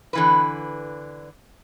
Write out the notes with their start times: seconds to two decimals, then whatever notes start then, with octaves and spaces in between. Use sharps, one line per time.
0.13 D3 E3 B4